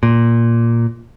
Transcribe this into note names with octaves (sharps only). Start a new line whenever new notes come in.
A#2